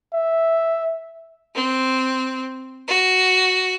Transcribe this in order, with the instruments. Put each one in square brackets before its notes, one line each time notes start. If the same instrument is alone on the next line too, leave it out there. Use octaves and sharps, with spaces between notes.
[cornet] E5
[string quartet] C4
F#4